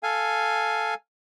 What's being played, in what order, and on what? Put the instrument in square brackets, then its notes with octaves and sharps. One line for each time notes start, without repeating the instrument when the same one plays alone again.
[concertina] A4 F5 G#5